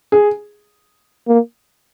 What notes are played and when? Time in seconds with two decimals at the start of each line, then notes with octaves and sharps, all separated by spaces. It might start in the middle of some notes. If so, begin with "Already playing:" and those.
0.12 G#4
1.27 A#3